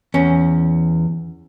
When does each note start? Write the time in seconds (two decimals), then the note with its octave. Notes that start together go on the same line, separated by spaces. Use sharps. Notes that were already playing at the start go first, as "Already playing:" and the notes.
0.14 E2 C#4